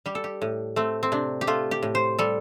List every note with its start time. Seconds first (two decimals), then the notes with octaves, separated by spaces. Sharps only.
0.06 G3 G4
0.15 A4
0.24 G4
0.42 A2
0.76 A3 C4
1.03 C4
1.12 C3 D4
1.41 G4
1.47 A3 F4
1.71 G4
1.83 A2
1.95 C5
2.19 G3 A4